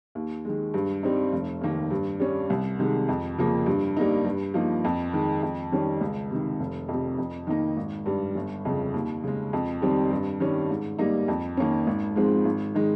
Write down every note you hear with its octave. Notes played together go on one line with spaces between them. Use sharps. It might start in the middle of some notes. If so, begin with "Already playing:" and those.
D#2
D#3 G#3
G2
G3 C4 D#4
F1
D#2 D#3 A#3
G2
G3 C#4
C2
C3 D#3 G#3
F2
C#3 F3 A#3
G2
G3 A#3 D#4
G2
F3 A#3 D#4
F2
D#3 G#3
F2
D#3 G3 C#4
C#2
C3 D#3
F1
F2 C3
F2
D#3 A#3 D#4
G#1
G2 G3
G1
F2 C#3
D#2
C#3 G#3
F2
D#3 G3 C4
G2
D#3 G3 C#4
G#2
G3 A#3 D#4
F2
D#3 A#3 C#4
G#1
G#2 F3 G#3 C4
G#1
D#3 G#3 D#4